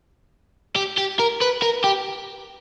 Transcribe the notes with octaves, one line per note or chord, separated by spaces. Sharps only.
G4
G4
A#4
B4
A#4
G4